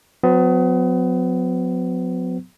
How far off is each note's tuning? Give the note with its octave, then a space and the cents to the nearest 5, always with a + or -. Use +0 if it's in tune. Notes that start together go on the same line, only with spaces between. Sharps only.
F#3 -35 B3 +35